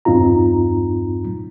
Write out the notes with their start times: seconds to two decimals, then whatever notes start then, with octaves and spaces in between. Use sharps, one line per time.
0.05 E2 G2 C4 D#4 F4 A#5